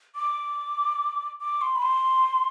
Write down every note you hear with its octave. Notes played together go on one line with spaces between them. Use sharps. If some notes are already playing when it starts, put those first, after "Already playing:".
D6
D6
C6
B5
C6